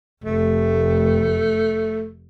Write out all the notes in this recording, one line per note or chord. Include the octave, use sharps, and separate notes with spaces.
F1 A3